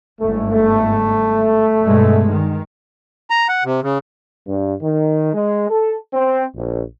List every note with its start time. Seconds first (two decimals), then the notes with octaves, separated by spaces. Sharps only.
0.20 G1 G#2 A3
0.52 A3
1.84 G2 B2 G#3
2.30 D#3
3.30 A#5
3.49 F#5
3.64 C3
3.83 C#3
4.47 G2
4.82 D#3
5.34 G#3
5.70 A4
6.13 C4
6.55 A#1